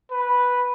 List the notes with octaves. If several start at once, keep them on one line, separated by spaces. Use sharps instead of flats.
B4